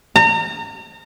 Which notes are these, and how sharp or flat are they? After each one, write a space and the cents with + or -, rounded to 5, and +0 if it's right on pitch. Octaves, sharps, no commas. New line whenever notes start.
A#5 -35